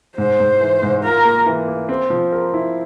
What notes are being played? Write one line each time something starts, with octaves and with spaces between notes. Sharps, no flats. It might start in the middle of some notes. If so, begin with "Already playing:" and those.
G#2 C5
G#2
E3
G#2
F4 A#4
A#3
E3
A#3
C4
F3
A#4
E4